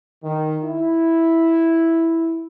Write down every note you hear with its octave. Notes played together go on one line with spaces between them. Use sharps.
D#3
E4